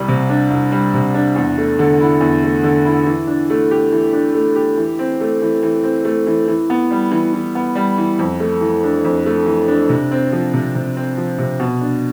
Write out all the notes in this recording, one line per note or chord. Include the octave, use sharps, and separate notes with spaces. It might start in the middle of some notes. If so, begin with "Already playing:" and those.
Already playing: C2 G3
C3
D4
C2
G3
C3
D4
E2
A3
D3
E4
E2
A3
D3
E4
E3
D4
A3
G4
E3
D4
A3
G4
E3
C4
A3
E3
E3
C4
A3
E3
E3
B3
G3
E3
E3
B3
G3
E3
F2
A3
E3
D4
F2
A3
E3
D4
C3
C4
F3
C3
C3
C4
F3
C3
B2
D4